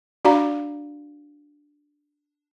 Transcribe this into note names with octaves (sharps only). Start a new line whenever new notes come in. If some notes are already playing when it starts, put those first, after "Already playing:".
D4 F#4 D5 F5 A#5